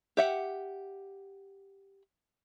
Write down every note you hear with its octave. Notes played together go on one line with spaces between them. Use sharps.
G4 E5 F#5